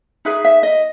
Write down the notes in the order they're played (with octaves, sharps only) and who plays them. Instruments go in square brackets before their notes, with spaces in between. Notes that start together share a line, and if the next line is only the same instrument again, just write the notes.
[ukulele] D#4 G#4 B4 E5
E5
D#5